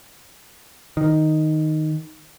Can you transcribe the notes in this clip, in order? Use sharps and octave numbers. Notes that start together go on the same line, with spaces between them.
D#3